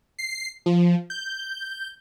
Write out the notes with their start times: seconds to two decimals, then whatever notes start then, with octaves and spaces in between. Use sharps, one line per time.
0.19 C7
0.66 F3
1.10 G6